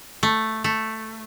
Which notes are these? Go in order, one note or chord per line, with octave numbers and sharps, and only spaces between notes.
A3
A3